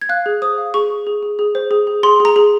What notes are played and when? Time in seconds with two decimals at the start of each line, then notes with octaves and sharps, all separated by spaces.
0.01 G#6
0.09 F5 F#6
0.26 G#4
0.42 C5 D#6
0.58 F5
0.74 G#4 C#6
0.90 G#4
1.07 G#4
1.23 G#4
1.39 G#4
1.55 C5
1.71 G#4
1.87 G#4
2.03 G#4 C6
2.20 G#4
2.25 A#5
2.36 G#4